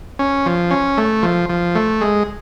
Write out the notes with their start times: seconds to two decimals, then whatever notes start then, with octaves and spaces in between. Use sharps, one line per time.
0.19 C#4
0.46 F3
0.71 C#4
0.97 A3
1.23 F3
1.49 F3
1.75 A3
2.01 G#3